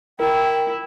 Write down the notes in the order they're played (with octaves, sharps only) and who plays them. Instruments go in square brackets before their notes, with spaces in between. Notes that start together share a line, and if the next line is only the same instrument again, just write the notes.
[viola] E4 [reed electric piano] A#4 [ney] G5